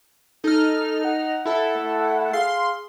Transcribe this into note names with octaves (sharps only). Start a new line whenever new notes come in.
D#4 A4 F6
F#5
E4 A4
A3
G#4 F5 C6